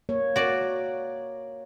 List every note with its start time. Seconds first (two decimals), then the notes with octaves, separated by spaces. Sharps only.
0.09 A#3 C#5
0.36 F#4 D5